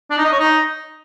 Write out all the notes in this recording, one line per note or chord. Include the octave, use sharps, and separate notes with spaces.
D4
D#4
D#5
C#5
D#4